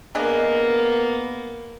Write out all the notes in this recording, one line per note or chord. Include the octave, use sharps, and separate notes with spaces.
A#3 B3 D4 G#4 D#5